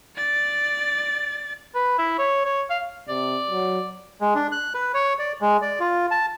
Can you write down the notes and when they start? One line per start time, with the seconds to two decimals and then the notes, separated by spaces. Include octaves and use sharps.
0.16 D5 A6
1.75 B4
1.98 E4
2.18 C#5
2.45 C#5
2.70 F5
3.09 C3 D5
3.50 F#3
4.21 G#3
4.35 D4
4.52 F#6
4.74 B4
4.94 C#5
5.19 D5
5.41 G#3
5.62 D5
5.80 F4
6.11 A5